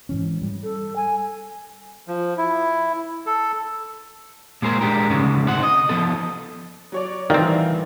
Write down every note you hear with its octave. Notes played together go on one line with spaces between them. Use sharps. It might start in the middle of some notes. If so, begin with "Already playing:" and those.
G#2 E3 C#4
G3
A4
G#5
F3
E4
A4
A#2 G#3 G#4 A#4 C5
G#3 D4 G4 A#4
D2 G#2 C#3 G#3
C3 C5 F#5
D#5
F3 B3 A4
F#3 C#5 D5
D#3 E3 G3 A3 C4 F4 D5